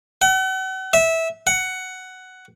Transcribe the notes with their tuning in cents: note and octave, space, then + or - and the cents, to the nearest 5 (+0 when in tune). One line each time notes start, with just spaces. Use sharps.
F#5 +40
E5 -15
F#5 +10